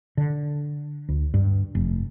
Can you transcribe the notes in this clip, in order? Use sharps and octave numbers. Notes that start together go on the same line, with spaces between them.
D3
D2
G2
F1